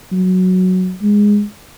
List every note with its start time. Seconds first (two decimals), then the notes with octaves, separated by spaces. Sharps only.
0.12 F#3
1.02 G#3